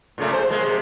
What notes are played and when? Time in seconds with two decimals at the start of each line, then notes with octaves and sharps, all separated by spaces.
0.18 A#2 C#3 A3
0.33 C5
0.50 G#3 A#3
0.65 C3